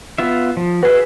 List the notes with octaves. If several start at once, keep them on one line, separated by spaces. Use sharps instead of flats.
B3 F4 E5
F3
F#4 G#4 B4 E5